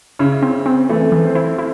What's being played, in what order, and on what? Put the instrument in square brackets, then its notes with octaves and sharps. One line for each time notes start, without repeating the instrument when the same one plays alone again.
[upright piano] C#3 [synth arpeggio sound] E4
[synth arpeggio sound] C4
C4
[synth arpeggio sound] E3 [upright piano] A3
[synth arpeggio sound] E3
[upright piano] C4
[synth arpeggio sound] E4
E4